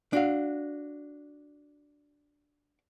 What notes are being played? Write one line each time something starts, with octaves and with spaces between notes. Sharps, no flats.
D4 F#4 F5